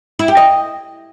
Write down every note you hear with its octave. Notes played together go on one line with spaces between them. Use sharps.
E4
G4
D#5